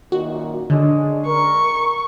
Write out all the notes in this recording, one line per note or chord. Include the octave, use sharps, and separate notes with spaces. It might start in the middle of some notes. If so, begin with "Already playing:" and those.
F#2 A#2 D#3 F#4
D3 G#3 C#4 D4
A#4 C#6